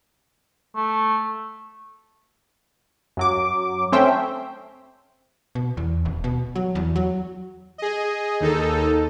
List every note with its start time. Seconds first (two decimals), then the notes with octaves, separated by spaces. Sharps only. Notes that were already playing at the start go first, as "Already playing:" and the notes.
0.76 A3
3.17 F#2 F#3 D6
3.92 A3 C4 C#4 C5 E5 G5
5.55 B2
5.77 E2
6.05 D#1
6.24 B2
6.55 F#3
6.75 E2
6.96 F#3
7.78 G#4 D#5
8.40 D#2 D#4 A4